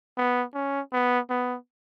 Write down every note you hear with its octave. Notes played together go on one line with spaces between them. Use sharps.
B3
C#4
B3
B3